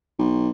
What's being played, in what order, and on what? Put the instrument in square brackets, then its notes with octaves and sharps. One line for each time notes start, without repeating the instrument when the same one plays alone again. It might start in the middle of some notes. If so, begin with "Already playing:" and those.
[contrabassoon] B1